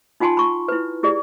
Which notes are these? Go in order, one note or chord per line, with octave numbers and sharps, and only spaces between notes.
D#4 F4 F#5 G#5 A5 C6
B5 C#6
E4 B4
E4 G4 G#4 D5